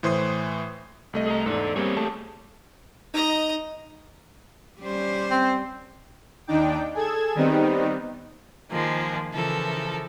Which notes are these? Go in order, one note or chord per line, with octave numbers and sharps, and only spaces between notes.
A2 E3 C5 C6 D#6 C7
C2 A3 D#5
G#4 A#5
E2 G#2 A4 D5
G3 A#3 C4 G4 G#4 C#5
A3 A5
D#4 D#5 A#5
G3 C#4 C5
C4
D#2 D4 D#4 G5 D6
G#4 A4 G#6 E7
D#3 G3 B3 C4 D#4
D#3 F3 G#3 A#3
C#3 E3 F3 A4 A#4